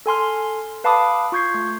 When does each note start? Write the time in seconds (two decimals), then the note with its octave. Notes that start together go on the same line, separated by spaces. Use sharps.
0.06 A4 G#5 C6 F6
0.84 B4 F5 A5 B5 D6 D#6
1.32 F4 C#6 G6 G#6 C7
1.54 A3